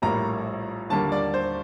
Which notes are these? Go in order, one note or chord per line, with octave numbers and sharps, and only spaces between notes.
A#1 A2 G3 A#3 A#5
D#2 D3 G3 A#3 A5
D5
C5